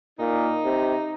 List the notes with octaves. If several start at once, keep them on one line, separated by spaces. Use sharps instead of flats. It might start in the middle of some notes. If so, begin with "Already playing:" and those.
A#2 D#4
C3